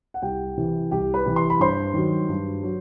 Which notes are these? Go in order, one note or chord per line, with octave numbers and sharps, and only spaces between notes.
F#5
C2 G4 G5
C3 E3
C2 G4 G5
B4 B5
C3 E3
C6
B5
G2 C5 C6
D#3 F#3
G2
F#3